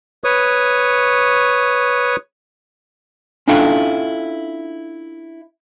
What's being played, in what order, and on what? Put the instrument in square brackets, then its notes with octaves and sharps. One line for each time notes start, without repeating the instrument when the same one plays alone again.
[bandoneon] B4 C#5 C#6 D#6
[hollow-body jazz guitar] C#4 D4 E4 F4 A4 G5